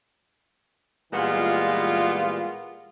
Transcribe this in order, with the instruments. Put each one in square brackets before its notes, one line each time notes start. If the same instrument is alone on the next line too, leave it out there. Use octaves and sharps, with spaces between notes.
[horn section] A#2 E3 G3 G#3 B3 F4